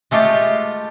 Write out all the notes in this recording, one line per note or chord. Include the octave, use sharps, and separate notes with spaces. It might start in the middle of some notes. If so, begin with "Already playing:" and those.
G#3 A3 F4 G4